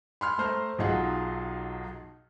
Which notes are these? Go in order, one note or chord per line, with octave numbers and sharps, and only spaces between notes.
B5 C6 F6
A3 C5 A#5 F6
B1 F#3 D#4 F4 G#4 F#5